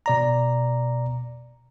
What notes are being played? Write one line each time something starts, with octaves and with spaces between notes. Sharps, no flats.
B2 D5 A#5